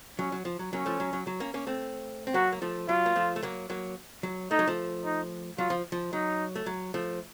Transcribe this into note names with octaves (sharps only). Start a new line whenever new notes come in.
F#3 C#4
F#3
F3
F#3
F#3 A#3 C#4
F3 A3
F#3
F#3
F#3
A#3 C#4
A#3 C#4
A3 C4
C4
F#3 A#3 F#4
A#3
F3 A3
F#3 F4
A#3
F3 A3
A3
F#3 A#3
F#3 A#3
F#3
A3 D#4
F#3
F3 A3
D#4
F#3 F4
F3
F3
F#3 D#4
A3
F#3
F3 A3